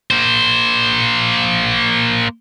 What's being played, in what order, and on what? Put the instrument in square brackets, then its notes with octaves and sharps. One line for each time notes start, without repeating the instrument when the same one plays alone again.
[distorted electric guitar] A#3 C5